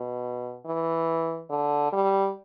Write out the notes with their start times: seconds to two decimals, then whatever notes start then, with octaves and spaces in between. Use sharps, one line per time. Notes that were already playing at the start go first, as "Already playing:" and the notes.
Already playing: B2
0.66 E3
1.50 D3
1.93 G3